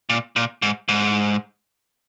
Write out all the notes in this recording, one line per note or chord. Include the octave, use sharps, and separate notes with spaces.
A#2
A#2
G#2
G#2